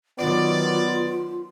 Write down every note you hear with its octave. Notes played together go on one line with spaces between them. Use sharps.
D#3 F#3 B3 F4 D5